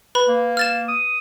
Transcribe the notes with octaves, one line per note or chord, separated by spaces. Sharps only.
B4 B5
A#3
F6 A6 E7
D#6